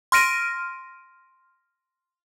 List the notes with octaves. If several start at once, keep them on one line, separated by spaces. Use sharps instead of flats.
C6 F6 A#6 D7 D#7